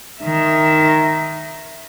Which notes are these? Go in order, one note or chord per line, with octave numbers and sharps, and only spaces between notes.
D#3 E5